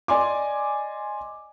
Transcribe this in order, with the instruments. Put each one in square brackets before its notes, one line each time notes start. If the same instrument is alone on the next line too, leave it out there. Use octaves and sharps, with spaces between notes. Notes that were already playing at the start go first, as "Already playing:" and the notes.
[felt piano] D5 D#5 G#5 C6 D6